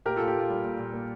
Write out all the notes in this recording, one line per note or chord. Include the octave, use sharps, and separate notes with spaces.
A#2 G4 A#4
A#2 F4 A4
G4
A#3 F4
G3
A#2
A#2
A#3